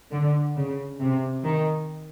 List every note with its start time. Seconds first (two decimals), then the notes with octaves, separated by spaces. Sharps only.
0.12 D3
0.56 C#3
1.00 C3
1.44 D#3